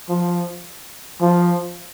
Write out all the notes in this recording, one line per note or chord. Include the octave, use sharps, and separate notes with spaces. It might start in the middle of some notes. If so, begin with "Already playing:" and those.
F3
F3